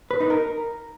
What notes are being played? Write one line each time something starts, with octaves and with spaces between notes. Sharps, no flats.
B4
D#4
A#4